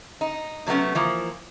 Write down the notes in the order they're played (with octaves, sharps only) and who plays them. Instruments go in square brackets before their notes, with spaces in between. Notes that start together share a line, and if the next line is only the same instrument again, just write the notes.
[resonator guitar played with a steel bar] D#4
C3 F#3 A3 B3 C#4
E3 F3 A#3